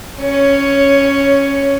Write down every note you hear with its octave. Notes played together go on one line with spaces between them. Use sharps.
C#4 C#5